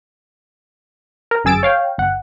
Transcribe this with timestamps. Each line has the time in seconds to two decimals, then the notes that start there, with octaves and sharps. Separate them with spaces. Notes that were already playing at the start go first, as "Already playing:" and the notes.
1.31 A#4
1.44 G1 F#2 G#4 E6 A6 D7
1.63 C#5 F5 G5
1.98 G1 F#5